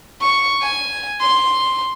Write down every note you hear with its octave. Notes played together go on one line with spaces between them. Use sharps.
C#6
G#5
C6